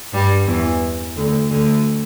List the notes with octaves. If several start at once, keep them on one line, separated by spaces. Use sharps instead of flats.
G2 G3
E2 E3
D2 D3
D2 D3